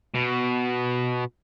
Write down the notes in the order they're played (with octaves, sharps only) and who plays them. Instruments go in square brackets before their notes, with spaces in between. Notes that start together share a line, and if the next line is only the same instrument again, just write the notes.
[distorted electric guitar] B2